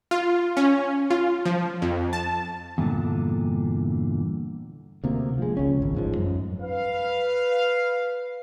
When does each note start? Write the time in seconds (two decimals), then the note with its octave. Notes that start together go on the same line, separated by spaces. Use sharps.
0.11 F4
0.57 C#4
1.10 F4
1.45 F3
1.82 F2
2.13 A5
2.78 E2 G2 A#2 D3
5.04 D2 C3 A#3
5.38 F3 G#3
5.57 C#2 C#4
5.82 G#1
5.95 A1 G#2 F3
6.17 F#2
6.61 B4 F5